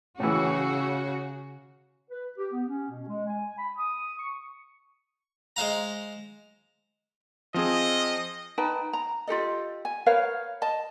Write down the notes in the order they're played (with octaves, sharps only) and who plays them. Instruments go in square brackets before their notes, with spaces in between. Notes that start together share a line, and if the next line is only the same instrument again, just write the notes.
[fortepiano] A2 E3 [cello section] C#3 F#4
[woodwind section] B4
G4
B3
C#4
B2
G#3
G#5
B5
D#6
C#6
[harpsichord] G#3 C5 F5 A#5
[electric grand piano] F3 C4 G#4 [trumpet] D#5
[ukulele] D#4 B4 G5 A5
A#5
F4 G4 A4 D#5
G#5
A#4 B4 C#5 F5
D#5 A5